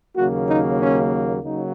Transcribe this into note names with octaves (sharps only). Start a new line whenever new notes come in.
D#2 C#3 F#3 A#3 F#4
D#4
C#4
C#3 F#3 A#3 D#4